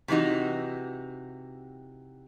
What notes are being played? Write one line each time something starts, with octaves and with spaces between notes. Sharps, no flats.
C3 E3 F#3 D#4 F#4